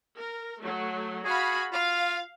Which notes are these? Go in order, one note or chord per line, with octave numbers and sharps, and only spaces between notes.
A#4
F#3 A3
F#4 G#4 F5 B5
F4 F5